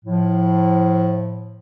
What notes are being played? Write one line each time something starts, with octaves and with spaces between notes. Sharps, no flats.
A2 F3